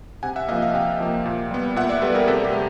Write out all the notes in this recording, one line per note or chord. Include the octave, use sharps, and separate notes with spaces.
C3 F#5 G#5
E5 F#5
F3 A#3 D#5 F5
D#5 F5
C3 F5 G5
F3 A#3
A#2
G3 B3
A#2 E5 F#5
D5 E5
G3 B3 A4 B4
G#4 A#4
C3 G4 A4
G4
A3